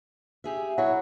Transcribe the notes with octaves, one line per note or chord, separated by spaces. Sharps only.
G4 G#4 E5
F#3 E4 C#5